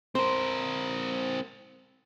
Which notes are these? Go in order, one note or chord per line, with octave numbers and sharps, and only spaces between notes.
C4 A#4 C5